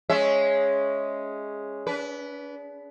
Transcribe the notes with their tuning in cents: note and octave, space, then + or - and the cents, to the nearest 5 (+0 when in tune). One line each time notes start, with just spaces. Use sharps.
G#3 +0 C#4 +0 E5 +0
D4 -40 B4 -5